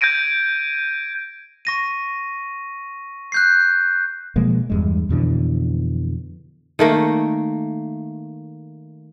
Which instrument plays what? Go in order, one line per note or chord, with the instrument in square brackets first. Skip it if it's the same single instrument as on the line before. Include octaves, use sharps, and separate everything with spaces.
[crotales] G6 G#6 A#6 D7 D#7
[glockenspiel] C#6 A#6 D#7
F#6 G6 C7
[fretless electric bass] B2 F3 G#3 A#3
E2 G2 G#3
F2 B2 D3 E3
[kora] D#3 A3 A#3